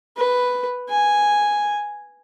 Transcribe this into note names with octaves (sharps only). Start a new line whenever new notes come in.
B4
G#5